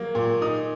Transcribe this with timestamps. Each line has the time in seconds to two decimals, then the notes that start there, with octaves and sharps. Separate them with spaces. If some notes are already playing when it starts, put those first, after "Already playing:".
Already playing: F#3 A#3
0.15 A#2
0.42 D#4 D#6